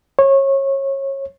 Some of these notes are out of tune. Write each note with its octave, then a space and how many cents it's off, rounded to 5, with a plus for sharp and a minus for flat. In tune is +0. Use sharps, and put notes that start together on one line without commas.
C#5 -25